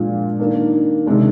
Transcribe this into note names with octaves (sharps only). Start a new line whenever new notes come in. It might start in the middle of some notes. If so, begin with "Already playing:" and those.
Already playing: A#2 F3 G#3 D4 F4
D#3 A#3 D4
C3 D#3 G#3 D4